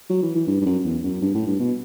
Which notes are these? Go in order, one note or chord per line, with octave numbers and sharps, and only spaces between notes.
F#3
E3
E3
G2
G2
F#2
E2
F#2
G2
A2
G2
B2